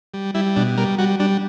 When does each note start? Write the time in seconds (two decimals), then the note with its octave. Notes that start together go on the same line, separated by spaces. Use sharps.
0.14 G3
0.34 G3 E4
0.56 B2 D4
0.78 G3 A#4
0.98 G3 F#4
1.20 G3 D4